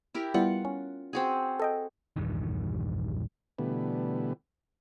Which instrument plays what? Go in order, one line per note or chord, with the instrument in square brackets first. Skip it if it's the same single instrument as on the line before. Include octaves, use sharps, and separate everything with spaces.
[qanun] E4 G4 A#4
[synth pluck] G3 B3 E4 [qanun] F4 F#5
[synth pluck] C#4
[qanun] C4 F#4 G#4
[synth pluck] A4 D#5 G5
[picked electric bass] A#1 E2 G2 D#3
[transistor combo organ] B2 D3 E3 G3 A3 B3